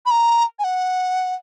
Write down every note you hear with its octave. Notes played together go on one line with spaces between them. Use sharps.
B5
A#5
G#5
F#5